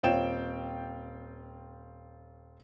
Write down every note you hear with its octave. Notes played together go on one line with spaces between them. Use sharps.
D#1 C4 F4 C#5 G5 E7